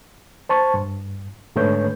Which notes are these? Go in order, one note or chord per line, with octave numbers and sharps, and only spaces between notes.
C5 A5 C#6
G2
G#2 D3 A3 B4 C#5 G6